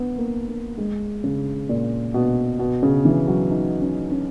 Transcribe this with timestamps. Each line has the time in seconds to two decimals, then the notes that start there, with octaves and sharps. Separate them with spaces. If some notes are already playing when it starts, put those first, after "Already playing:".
Already playing: B3
0.18 A#3
0.48 A#3
0.78 G#3
1.24 C#3
1.69 A#2
2.14 B2
2.59 B2
2.83 C#3
3.05 E3
3.28 F#3
3.51 D#4
3.81 C#4
4.11 C#4